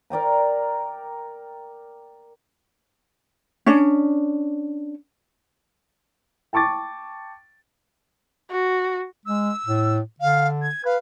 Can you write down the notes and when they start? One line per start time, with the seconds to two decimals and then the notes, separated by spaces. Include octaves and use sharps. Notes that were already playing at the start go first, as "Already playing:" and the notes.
0.10 A#4 D5 G5 A#5
3.66 C#4 D4
6.53 G5 A5 C#6 D6 A6
8.50 F#4
9.26 G#3 E6
9.66 A2
10.20 D3 F5
10.62 G#6
10.85 B4 F5